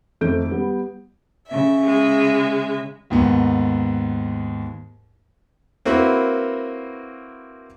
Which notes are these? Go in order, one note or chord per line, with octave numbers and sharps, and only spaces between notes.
F2 D#3 A3 G6 D7
G3 B3
C#3 E5
G#3
D#2 G#2 B3
A#3 C4 E4 F#4 A#4 B4